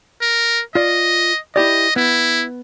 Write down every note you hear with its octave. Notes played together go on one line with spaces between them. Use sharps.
A#4
F4 D5 D#5
E4 G4 D5 D#5
B3 E4